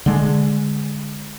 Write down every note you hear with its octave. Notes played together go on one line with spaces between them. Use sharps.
D3 G#3